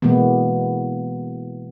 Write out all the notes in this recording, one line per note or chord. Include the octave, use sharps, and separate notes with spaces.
B2 E3 G#3 A#3 B3